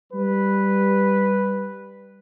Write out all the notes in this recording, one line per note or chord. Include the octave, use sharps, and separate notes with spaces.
G3 B4